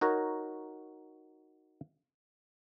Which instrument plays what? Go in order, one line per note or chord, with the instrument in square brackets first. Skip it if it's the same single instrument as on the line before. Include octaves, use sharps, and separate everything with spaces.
[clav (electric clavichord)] D#4 F#4 A#4 C#5